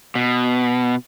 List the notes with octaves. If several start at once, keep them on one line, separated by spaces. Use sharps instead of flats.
B2